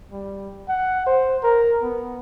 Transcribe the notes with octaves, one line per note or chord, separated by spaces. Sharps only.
G3
F#5
C5
A#4
B3